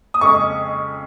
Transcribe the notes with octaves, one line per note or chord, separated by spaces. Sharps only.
D#6
F2 C#3 G#3 C#4 C#6